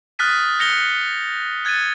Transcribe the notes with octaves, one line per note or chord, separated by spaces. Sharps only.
D#6 F6 F#6 A6 B6 D#7
G6 A#6 C#7 F7 G7
F#6 G#6 A6 C#7 D#7